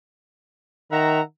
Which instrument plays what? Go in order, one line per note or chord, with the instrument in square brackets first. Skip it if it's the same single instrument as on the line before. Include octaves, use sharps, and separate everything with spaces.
[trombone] D#3 [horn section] E5 F#5 A#5